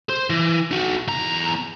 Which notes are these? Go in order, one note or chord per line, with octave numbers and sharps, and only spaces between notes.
C5
E3
D#4 F#4
E2 A#5